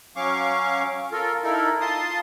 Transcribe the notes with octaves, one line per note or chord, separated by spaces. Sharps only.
F#3 C#4 F5 C#6 D6
F4 A4 A#4
D#4 E4 A4 A#4
F4 A5 C6 D#6